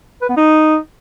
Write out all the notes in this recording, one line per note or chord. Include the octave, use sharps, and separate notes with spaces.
B4
B3
D#4